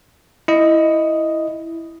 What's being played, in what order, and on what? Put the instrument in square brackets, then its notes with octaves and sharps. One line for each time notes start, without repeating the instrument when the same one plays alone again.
[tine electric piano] E4 D#5